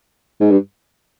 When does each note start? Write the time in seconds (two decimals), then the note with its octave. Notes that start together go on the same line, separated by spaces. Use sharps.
0.41 G#2
0.51 G2